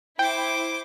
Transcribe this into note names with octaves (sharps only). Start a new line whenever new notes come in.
E4 C5 G5 D6